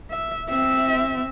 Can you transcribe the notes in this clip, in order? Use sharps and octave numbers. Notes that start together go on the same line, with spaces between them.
E5
C4 E5